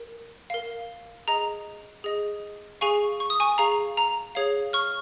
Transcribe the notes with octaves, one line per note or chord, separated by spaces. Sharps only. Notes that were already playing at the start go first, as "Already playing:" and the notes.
Already playing: A#4
A#4 F5
G#4 D#5 A#5
G#4 D#5
G#4 F5 G#5 C#6
C#6
D#6
G#5 C#6
G#4 F5 A#5
A#5
G#4 C#5 F5
C#6 F6